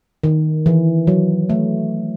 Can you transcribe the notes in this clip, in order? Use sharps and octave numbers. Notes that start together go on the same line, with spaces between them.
D#3
E3
F#3
A3